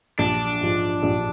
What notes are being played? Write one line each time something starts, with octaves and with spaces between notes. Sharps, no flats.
A#1 D4
G#2 F3
A#1